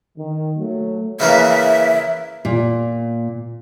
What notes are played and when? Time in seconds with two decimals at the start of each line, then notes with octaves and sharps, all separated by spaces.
0.18 D#3
0.56 F#3 A3
1.20 C#3 E3 A#3 E5
2.45 A#2